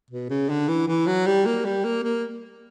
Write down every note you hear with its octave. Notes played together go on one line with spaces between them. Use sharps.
B2
C#3
D3
E3
E3
F#3
G3
A#3
G3
A#3
A#3